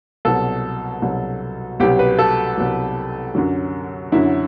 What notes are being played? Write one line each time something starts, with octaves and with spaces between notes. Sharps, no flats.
C2 B2 F#3 A4
C2 B2 F#3
C2 B2 F#3 G4
B4
A4
C2 B2 F#3
F#2 D3 F#3
F#2 D3 F#3 E4